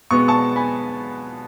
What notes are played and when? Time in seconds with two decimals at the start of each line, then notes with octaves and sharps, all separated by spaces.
0.11 B2 G#3 B3 C#6
0.28 A5 C#6
0.56 G#5 B5